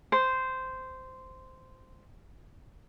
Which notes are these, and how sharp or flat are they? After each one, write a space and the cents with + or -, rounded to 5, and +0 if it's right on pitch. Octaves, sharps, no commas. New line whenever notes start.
C5 -10